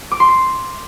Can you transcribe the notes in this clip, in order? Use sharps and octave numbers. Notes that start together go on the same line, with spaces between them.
D6
C6
C7